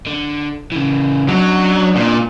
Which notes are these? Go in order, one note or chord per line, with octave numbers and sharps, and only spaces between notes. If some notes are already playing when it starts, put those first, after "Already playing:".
D3
C#3 E3
F#3 D4 D#4
A#2